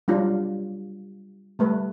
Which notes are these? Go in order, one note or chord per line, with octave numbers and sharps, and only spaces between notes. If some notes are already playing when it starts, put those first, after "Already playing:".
F#3 G3 D4 F4
G3 A3 B4